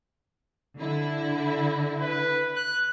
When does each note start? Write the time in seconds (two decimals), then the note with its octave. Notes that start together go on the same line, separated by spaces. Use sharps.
0.77 D3 E4
2.01 B4
2.56 F#6